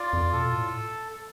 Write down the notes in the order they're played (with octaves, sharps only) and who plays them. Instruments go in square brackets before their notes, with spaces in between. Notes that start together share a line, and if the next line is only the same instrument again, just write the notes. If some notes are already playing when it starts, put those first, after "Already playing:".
Already playing: [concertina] F4 D5
[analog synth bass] F2
[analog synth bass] B2 [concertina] A4
[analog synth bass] A2